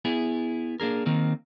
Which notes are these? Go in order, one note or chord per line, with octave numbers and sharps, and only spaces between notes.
B3 E4 G#4
A#3 D4 G#4 A#4
D#3 A#3 C4